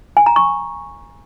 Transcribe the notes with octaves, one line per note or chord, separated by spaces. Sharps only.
G#5
A#5
C#6